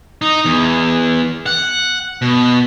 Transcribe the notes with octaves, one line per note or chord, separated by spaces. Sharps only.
D#4
E2
F#5
B2